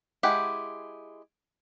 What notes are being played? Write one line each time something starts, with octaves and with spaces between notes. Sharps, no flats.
G#3 E4 G4 F#5 G5